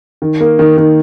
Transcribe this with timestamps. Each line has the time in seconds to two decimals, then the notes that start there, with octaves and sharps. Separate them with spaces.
0.22 D#3
0.41 A#3
0.59 D#3
0.77 D#3